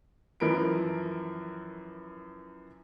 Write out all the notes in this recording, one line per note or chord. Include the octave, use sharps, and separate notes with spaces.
F#2 E3 F3 A#4 B5 D7